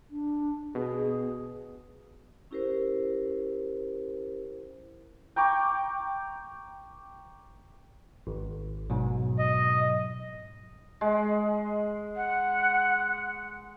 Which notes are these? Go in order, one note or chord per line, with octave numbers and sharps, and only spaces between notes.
D4
B2 G#4
C#4 E4 G4 A#4 C5
G5 A#5 C#6 D6
G#1
G#2 B2 F#3
D#5
G#3
F#5